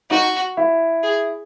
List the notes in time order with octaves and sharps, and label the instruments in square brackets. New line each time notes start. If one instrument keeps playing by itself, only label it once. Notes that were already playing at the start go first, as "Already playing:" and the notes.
[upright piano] D#4 [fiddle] F#4
[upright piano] E4
[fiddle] G#4